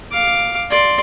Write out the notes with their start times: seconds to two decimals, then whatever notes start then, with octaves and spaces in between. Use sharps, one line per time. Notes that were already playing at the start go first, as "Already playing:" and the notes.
0.11 F5 D6
0.70 D5 C6